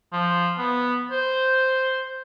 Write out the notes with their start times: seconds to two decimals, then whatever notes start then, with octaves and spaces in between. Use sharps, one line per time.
0.13 F3
0.58 B3
1.11 C5